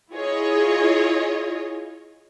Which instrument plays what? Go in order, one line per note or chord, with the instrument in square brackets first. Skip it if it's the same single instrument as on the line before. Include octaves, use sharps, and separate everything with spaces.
[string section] E4 F4 G#4 C#5 D#5